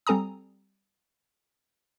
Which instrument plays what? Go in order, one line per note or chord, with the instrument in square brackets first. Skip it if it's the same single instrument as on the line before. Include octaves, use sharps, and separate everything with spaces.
[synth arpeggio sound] G3 C4 A4 G#5 A#5 D#6